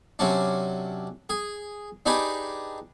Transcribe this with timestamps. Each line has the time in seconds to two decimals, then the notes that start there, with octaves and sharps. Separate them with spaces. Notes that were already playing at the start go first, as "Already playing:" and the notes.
0.19 C3 F#3 C#4 D4
1.29 G#4
2.06 D4 D#4 G4 G#4 B4